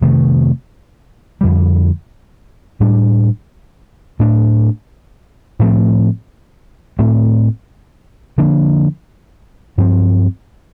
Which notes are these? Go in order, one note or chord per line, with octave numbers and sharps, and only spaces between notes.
F2 C3 D#3 A3
F2 D3 G3
A2 G3 D4
A2 A3 D4
A2 F3 A3 C4
A2 A3 C4
D3 F3 A#3 D4
G2 F3 C4